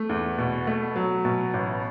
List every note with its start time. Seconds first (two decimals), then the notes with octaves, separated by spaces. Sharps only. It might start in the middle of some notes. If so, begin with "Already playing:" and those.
Already playing: A3
0.09 E2
0.38 B2
0.67 A3
0.96 F#3
1.25 B2
1.54 A1